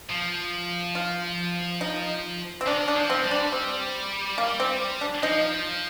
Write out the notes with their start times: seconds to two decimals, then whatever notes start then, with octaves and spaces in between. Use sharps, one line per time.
0.10 F3
0.95 F4
1.81 D#4
2.61 C4
2.66 D#3 D4
2.88 D4
2.95 F3
3.10 C4
3.23 G3
3.31 D4
3.52 C4
4.38 A#3
4.60 C4
5.01 D4
5.23 F3 D#4